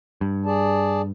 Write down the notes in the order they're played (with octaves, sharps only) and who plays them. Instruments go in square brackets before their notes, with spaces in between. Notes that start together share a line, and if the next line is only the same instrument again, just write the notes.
[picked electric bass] G2
[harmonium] G#4 D5 A5